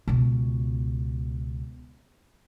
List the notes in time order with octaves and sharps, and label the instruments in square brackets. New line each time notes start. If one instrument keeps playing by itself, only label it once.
[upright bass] C#2 B2